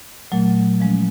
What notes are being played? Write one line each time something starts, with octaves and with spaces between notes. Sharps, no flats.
A#2 F#3 A3
F3 G#3 C#4